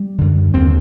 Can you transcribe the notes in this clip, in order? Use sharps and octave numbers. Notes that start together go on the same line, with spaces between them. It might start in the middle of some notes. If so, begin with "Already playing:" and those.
Already playing: G3
F#2 D3
D#2 D3 C4